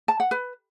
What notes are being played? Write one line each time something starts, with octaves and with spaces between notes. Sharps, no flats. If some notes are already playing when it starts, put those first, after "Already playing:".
A5
F#5
B4